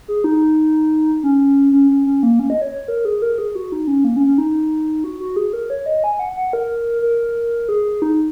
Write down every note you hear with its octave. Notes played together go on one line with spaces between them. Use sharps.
G#4
D#4
C#4
C#4
C#4
C#4
A#3
C#4
D#5
C#5
C#5
A#4
G#4
A#4
G#4
F#4
D#4
C#4
A#3
C#4
C#4
D#4
F#4
F#4
G#4
A#4
C#5
D#5
G#5
F#5
F#5
A#4
A#4
G#4
D#4